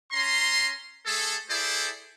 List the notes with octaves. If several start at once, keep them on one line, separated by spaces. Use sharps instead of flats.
C#4 A#5 C6
A3 G#4 A4
E4 G#4 A4 C5 D5